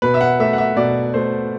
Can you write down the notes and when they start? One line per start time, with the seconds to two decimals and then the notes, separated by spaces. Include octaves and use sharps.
0.02 B2 B4
0.14 E5
0.21 F#5
0.40 A3 E5
0.53 F#5
0.58 E5
0.76 B2 D5
1.14 A3 C5